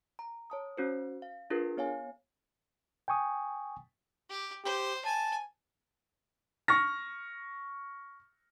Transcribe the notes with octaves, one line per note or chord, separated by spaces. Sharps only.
A#5
C#5 A5 D#6
C#4 F#4 C5
F5
D4 F4 G#4 A#4 B4
B3 C#5 F5 G#5
G5 G#5 C#6 D#6
G4
G4 C5
G#5 A5
C#6 F6 A#6